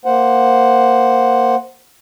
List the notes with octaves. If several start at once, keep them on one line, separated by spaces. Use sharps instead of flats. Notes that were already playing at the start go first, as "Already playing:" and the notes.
A#3 C5 F#5